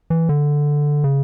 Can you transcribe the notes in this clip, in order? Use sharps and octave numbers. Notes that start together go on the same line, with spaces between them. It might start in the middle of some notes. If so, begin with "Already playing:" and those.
E3
D3
C#3